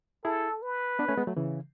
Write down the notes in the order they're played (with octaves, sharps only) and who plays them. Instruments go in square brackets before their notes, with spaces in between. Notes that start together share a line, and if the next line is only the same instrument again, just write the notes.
[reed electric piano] E4 G#4 [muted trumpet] A4
[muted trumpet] B4
[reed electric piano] B3 D4
A3 C#4
G#3 B3
F#3 A3
C#3 E3